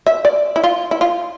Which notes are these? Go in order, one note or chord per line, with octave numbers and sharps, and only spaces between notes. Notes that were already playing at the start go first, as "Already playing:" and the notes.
E5
D5
E4
F4
E4
F4